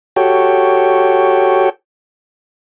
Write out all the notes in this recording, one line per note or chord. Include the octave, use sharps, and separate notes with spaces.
F#4 G4 A4 C#5 G5